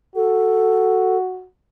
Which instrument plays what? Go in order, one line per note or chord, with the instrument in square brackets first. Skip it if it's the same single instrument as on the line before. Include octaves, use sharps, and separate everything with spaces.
[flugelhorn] F#4 [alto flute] A4